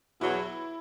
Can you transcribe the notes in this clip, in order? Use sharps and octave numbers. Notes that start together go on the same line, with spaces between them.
E2 B2 F#3 E4